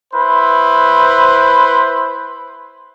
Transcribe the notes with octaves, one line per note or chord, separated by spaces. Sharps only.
E4 B4 C5 B5